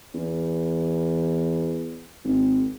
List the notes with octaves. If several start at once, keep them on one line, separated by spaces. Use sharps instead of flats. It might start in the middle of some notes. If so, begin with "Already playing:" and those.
E2
G#1